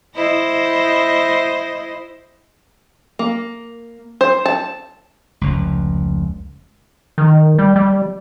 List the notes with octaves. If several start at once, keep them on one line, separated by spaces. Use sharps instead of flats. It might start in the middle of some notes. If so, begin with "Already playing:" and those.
E4 C5 D#5
A#3
C5
A5
F1 C#2
D#3
G3
G3